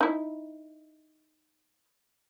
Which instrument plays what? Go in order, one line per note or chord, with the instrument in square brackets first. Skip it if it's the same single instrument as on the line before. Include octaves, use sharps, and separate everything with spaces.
[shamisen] D#4 E4